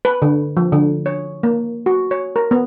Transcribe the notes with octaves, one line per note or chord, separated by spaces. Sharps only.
B4
D3
F3
D3
C#5
A#3
F#4
C#5
A#4
B3